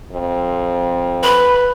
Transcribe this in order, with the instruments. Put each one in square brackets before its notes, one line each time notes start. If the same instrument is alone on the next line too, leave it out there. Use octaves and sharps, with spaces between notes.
[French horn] F2
[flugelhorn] B4 [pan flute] B5